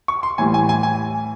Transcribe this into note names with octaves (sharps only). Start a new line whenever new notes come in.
C#6
C6
A2 E3 G3 G#5
G#5
G#5
G#5